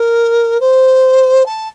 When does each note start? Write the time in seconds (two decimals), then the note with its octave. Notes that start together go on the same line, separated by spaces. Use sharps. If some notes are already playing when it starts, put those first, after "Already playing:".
Already playing: A#4
0.60 C5
1.46 A5